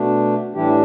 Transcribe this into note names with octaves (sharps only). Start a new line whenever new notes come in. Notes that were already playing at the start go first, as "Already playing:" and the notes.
Already playing: B2 A3 D4
A2 E3 G3 D4 E4 G4